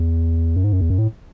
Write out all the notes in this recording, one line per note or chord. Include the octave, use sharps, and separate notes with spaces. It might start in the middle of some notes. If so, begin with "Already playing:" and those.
Already playing: E2
F#2
G#2
F#2
E2
F#2
A2